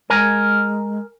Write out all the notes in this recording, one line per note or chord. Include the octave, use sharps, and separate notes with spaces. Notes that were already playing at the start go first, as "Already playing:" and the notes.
G#3 A#4 G#5